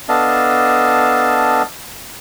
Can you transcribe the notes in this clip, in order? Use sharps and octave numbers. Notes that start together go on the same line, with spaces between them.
B3 D4 A4 D#5 F5 A5